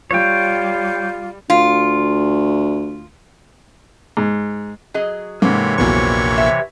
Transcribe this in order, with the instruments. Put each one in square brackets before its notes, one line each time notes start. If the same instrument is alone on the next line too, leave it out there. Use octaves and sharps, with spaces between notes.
[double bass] G3 [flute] F4 [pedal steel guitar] C#5 G5
[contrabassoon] D2 [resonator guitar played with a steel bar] F4
[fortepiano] G#2
[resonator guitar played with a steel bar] F#3 G#4 D#5
[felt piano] G#2 [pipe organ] C3 E3 C#5 [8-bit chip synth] A#3 [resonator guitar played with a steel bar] C#4 A4
[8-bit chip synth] A#1 A#3 C#6 [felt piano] E2 F#3
[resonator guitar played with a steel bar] E5